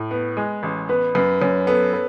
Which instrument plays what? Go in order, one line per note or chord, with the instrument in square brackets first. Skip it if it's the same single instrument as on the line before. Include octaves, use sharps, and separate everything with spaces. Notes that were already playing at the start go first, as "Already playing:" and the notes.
Already playing: [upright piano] A2
B3
G#3
A1
[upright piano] B3 [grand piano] B4
[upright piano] F#2 [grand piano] B4
[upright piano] F#2 [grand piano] C#4
[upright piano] B3 [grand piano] A4
[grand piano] B4